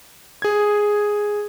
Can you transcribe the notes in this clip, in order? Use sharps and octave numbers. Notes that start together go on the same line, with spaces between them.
G#4 G#6